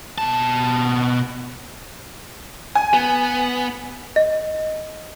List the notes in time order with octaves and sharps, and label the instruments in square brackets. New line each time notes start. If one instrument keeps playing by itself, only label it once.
[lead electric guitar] B2 A5
[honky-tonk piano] G#5
[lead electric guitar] B3
[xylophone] D#5